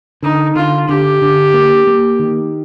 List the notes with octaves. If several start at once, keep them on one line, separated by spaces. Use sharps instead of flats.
D3 D#4
D3 F4
D3 G4
D3
A#3
A#3
D#3